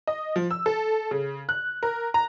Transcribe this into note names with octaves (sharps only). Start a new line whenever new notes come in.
D#5
F3
E6
A4
C#3
F#6
A#4
A#5